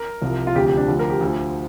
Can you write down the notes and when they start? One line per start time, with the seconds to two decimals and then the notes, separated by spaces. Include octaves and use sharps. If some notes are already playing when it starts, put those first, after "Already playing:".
Already playing: A#4
0.22 C2 C3 F3
0.47 F4
0.55 D2 C3 F3 G4
0.66 G4
0.77 D4
0.88 D2 D3 F3
0.99 A#4
1.10 G4
1.21 D2 D3 F3